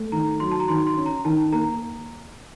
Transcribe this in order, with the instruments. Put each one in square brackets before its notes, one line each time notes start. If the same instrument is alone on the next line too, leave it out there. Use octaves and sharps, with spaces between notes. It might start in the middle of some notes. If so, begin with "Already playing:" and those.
Already playing: [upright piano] A3
[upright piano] D#3 [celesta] A#5
[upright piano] F#3 [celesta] C6
[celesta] A5
A#5
[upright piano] D#3 [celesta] C6
[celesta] C6
[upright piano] C#4
[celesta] A#5
[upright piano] D#3 [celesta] A5
[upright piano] A#3 [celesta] A#5